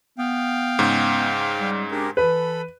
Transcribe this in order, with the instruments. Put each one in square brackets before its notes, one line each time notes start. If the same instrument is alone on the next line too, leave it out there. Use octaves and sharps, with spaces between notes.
[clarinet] B3 [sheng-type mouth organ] F5 G5
[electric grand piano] G#2 C#3
[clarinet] G3
[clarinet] D4 [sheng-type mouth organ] G4 G#4 A#4
[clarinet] E3 [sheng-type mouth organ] A4 B5 [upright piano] B4